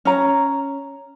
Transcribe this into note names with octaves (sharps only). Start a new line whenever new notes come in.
C#4 A#5